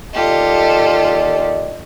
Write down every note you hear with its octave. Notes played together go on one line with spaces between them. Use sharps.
D#2 F4 G4 A4 D5 D#5